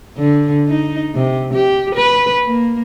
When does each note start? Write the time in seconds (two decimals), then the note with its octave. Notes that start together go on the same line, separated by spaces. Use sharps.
0.18 D3
0.68 D#4
1.15 C3
1.54 G4
1.96 B4
2.46 A#3